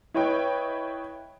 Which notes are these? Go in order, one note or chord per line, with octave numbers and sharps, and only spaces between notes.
E4 B4 C#5 D#5 G5